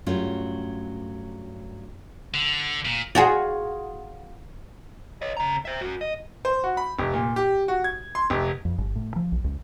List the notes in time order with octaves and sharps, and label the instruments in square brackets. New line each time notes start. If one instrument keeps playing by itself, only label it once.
[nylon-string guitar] G2 F#3 A3 C#4 F4
[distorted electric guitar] D3
A#2
[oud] F4 F#4 G#4
[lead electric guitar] C#5 D#5
C#3 A#5
C5 E5
F#4 A#4
D#5
[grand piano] C5
F#4
B5
F1
A#2
G4
F#4
G#6
C6
F1
[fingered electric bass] F2
G1
A2
F3
B1
C#2